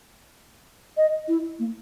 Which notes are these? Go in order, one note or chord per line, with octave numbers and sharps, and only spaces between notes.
D#5
E4
A#3